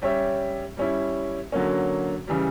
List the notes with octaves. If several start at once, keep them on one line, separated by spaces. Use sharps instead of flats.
G3 C#4 G4 C#5 E5
G3 C#4 E4
D3 F#3 A#3 C#4
C#3 E3 G3